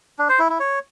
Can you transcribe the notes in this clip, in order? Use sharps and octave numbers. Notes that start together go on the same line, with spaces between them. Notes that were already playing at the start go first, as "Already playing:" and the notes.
D4
C5
E4
E4
C#5